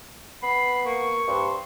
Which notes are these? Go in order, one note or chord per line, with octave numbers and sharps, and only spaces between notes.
B3 B5 C7
A#3 C#6
G2 C5